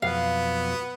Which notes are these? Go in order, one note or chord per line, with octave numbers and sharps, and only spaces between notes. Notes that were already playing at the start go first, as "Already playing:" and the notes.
F2 B2 F#3 B3 F5